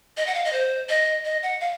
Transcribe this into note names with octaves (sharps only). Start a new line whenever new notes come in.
D#5
F#5
F5
D#5
C5
D#5
D#5
F#5
F5